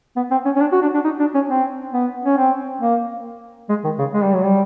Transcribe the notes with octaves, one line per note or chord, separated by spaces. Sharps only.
B3
C4
C#4
C#4
D4
F#4
D4
D4
D#4
D4
C#4
C4
B3
C#4
C4
A#3
G#3
D#3
C#3
G#3
G3
F#3
G3